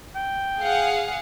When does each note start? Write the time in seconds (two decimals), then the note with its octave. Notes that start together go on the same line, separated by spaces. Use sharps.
0.15 G5
0.61 G#4 F5 F#5